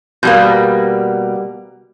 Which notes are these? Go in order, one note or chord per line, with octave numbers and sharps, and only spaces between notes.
B2 G3 A#3